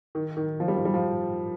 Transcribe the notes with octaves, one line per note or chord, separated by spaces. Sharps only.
D#3
D#3
F3
G3
F3
G3
F3